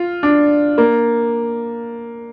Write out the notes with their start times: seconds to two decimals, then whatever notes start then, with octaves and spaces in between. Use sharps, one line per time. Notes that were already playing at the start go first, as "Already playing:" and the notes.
Already playing: F4
0.23 D4
0.78 A#3